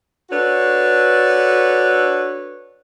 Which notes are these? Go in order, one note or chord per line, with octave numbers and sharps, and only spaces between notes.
D4 F#4 A4 B4 C#5